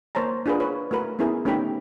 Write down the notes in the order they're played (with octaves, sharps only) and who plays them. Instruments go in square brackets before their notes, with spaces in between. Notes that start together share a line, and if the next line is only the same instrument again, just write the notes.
[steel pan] A#3 C5 C#5 A5 A#5
D4 F4 G#4 A#4 B4
B4 C#5
A3 F#4 A#4 B4
B3 C#4 E4 G#4 A#4
A3 B3 C#4 D#4 G4 B5